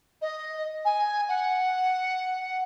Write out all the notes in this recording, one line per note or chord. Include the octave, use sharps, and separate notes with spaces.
D#5
G#5
F#5